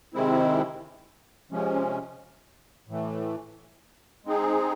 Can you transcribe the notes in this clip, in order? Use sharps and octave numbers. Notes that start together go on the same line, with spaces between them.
C3 D#3 G#3 C4 E4
C3 F3 G#3 C#4
A2 E3 A3
G#3 C4 D#4 G#4